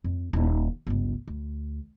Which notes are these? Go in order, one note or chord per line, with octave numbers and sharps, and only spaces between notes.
F2
D#1 D#4
G1 C#2
D2